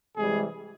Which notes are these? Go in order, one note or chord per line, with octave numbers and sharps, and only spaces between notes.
C3 E3 G3 G#3 G#4